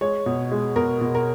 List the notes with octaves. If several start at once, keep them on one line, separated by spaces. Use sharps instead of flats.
G#3 C#5
B2
G#3
B2 A#4
B2
A#4